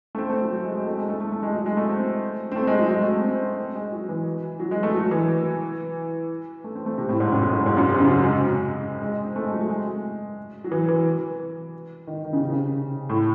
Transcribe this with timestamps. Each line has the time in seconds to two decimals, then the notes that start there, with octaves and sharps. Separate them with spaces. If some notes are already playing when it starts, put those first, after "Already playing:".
0.15 A3
0.18 C4
0.30 A3
0.42 F#3
0.52 F#3
0.64 G#3
0.75 G#3
0.86 A3
0.98 G#3
1.09 A3
1.21 A3
1.32 A3
1.43 G#3
1.54 F#3
1.66 G#3
1.77 A3
1.88 C4
2.52 C4
2.56 A3
2.67 G#3
2.79 F#3
2.91 G#3
3.01 A3
3.12 C4
3.27 C4
3.42 C4
3.75 G#3
3.92 F#3
4.09 E3
4.60 F#3
4.71 G#3
4.83 A3
4.94 F#3
5.11 E3
6.64 A3
6.75 C4
6.86 A3
6.98 C3
7.09 A2
7.20 G#2
7.32 F#2
7.42 F#2
7.49 G#2
7.66 G#2
7.77 F#2
7.88 C3
8.00 C#3
8.11 F#3
8.23 G#3
9.02 G#3
9.24 C4
9.36 A3
9.45 G#3
9.53 F#3
9.61 A3
9.69 G#3
10.64 F#3
10.72 E3
10.89 E3
12.07 D#3
12.24 D#3
12.33 C#3
12.42 C3
12.50 C#3
13.09 A2